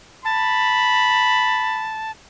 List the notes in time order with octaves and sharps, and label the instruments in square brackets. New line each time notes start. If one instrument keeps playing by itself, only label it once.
[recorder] A5 [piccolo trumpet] B5